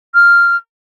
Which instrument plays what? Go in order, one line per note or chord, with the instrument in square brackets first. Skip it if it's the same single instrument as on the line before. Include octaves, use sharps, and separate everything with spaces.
[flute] F6